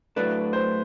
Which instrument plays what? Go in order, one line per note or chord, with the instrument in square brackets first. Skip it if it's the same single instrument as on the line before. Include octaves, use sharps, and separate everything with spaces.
[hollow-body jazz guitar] A2 F#3 A3 D4 [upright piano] B4
[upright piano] C5